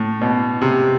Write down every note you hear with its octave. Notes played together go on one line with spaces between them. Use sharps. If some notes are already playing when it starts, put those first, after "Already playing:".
Already playing: A2
B2
C3